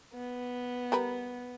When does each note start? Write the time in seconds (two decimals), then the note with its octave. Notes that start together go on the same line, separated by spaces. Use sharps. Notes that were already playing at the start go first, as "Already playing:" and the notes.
0.14 B3
0.92 G3 A#4 B4